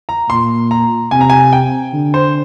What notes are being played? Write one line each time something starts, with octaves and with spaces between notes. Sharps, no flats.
A#5
A#2 C6
A#5
C3 G#5
A#5
G#5
G5
D3
C5